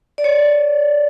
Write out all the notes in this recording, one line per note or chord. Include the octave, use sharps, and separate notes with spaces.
D5
C#5